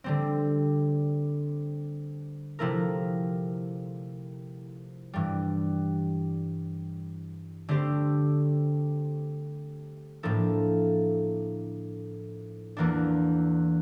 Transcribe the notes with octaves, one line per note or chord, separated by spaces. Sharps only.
D3 G3 C4
C3 F3 A3 E4 A#4
G2 E3 G3
D3 A3 C4 G4 C5
A2 F3 A#3 D4 A4
E2 E3 A#3 D4